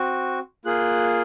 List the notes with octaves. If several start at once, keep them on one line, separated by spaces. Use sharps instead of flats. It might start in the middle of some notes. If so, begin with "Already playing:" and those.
Already playing: C4 F#4
A#3 F4 G#4 F#6